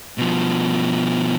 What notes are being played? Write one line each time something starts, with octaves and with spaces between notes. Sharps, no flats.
B2 F3